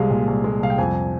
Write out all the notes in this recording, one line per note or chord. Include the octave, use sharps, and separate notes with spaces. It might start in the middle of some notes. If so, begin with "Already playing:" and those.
Already playing: C2 G3 G#3 F5
A#2
C2
G#3
C2 F5
G5
F2 G#5